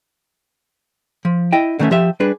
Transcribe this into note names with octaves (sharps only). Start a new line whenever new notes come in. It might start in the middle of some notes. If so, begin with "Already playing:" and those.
F3
E4 D#5 G5
D3 D#3 A3 B3 C#4 E5
F3 G4 E5
G3 D4 G#4 B4